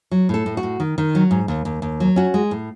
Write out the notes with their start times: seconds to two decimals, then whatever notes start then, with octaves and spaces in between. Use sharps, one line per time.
0.11 F#3
0.29 A2 A4
0.46 A2
0.57 F#4
0.63 A2
0.80 D#3
0.98 D#3
1.15 F#3
1.31 G#2
1.48 D#2
1.65 D#2
1.82 D#2
2.00 F#3
2.16 C#4 F#4
2.34 G#3
2.51 A2